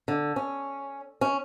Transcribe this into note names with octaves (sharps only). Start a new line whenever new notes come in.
D3
C#4
C#4